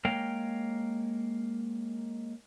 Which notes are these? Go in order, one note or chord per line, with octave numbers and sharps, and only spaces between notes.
G#3 A#3 A#4 C#5 F5 G5